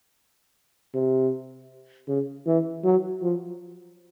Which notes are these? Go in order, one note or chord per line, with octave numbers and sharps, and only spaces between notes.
C3
C#3
E3
F#3
F3